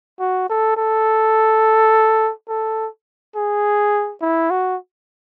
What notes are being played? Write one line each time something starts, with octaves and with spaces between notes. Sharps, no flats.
F#4
A4
A4
A4
G#4
E4
F#4